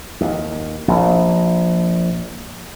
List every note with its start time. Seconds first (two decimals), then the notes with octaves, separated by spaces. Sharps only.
0.21 D#2
0.88 A#1